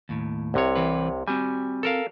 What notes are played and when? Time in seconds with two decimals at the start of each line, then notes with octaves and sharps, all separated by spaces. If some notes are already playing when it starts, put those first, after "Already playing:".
0.09 D#2 A2
0.54 C2 C3 C#5
0.75 E3 C4 B4
1.28 G3 C4 F#4 G#5
1.83 A4 A#4 F5